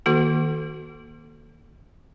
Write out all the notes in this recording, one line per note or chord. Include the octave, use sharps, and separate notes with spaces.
D#3 A#3 F#4 A4